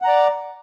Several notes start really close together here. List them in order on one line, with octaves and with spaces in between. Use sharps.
F#5 A#5 D5